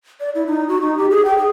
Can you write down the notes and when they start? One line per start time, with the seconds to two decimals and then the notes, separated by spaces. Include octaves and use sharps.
0.20 D5
0.35 E4
0.47 D#4
0.68 F#4
0.81 D#4
0.98 G4
1.10 G#4
1.25 G5
1.38 G#4